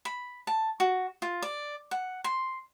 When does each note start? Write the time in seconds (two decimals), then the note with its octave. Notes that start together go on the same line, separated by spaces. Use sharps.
0.05 B5
0.47 A5
0.80 F#4
1.22 F4
1.42 D5
1.91 F#5
2.24 C6